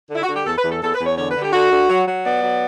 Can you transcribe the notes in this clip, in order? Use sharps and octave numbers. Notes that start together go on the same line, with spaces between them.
D3
E4
F#4
D3
G4
E2 A4
B4
E2
A4
E2 A4
B4
E2
C#5
D3 C#5
B4
D3
G4
D3 F#4
D3
F#3
F#3
B3 D5
F#3